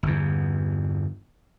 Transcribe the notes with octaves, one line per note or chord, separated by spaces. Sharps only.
G1 E2